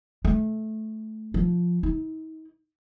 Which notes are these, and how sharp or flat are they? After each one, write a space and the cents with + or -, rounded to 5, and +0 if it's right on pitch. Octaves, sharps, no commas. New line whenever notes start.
A3 -15
F3 +5
D#4 +40